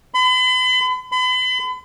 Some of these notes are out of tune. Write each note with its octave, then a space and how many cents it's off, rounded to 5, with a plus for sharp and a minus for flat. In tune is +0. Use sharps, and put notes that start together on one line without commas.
B5 +40
B5 +40